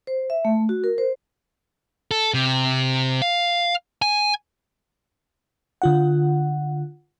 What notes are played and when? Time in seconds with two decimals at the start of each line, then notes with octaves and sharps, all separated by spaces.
0.07 C5
0.30 E5
0.45 A3
0.69 F#4
0.84 A#4
0.98 C5
2.11 A4
2.34 C3
3.22 F5
4.02 G#5
5.82 D3 F4 F#5